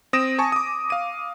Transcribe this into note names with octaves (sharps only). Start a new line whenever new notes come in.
C4 D#6 A#6 D7 E7
G#5 A5 C#6
D6 D#6
F5 D#7